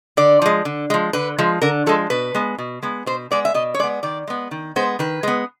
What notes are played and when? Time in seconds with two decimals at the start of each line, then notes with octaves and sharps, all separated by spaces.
0.17 D3 D5
0.42 F3 G#3
0.65 D3
0.90 F3 G#3
1.13 D3 B4
1.38 F3 G#3
1.62 D3 A#4
1.86 F3 G#3 A4
2.10 B2 B4
2.35 G#3 B3
2.58 B2
2.83 G#3 B3
3.06 B2 C5
3.31 G#3 B3 D5
3.45 E5
3.54 B2 D#5
3.74 C#5
3.79 G#3 D5
3.83 B3
4.03 D#3 D5
4.28 G#3 B3
4.51 D#3
4.76 G#3 B3 C5
4.99 D#3 B4
5.23 G#3 B3